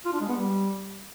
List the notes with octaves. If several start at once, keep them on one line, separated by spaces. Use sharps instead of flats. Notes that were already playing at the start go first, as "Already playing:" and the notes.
F4
D4
G#3
B3
G3